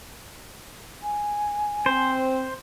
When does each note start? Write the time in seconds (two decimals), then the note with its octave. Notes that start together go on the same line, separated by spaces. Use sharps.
1.03 G#5
1.86 C4 C5